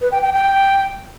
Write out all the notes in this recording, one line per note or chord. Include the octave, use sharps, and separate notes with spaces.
B4
G5
G5
G5